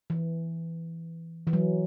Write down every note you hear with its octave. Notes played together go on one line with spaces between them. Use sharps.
E3
E3
F#3